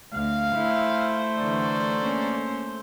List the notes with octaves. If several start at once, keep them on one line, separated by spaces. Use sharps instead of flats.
D2 F5
A3 E4 C5
D3 E3 F#4 A#4 D5
A#3 C#4